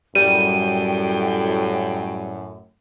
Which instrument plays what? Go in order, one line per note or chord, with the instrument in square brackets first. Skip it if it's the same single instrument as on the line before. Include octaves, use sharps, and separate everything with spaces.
[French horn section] F#2 A2 [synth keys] G3 [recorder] G5 [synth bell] D#7